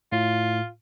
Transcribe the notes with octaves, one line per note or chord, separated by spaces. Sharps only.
A2 F4